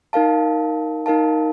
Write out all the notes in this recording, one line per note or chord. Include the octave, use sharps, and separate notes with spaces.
D#4 A#4 F5 A5
D#4 A#4 F5 A5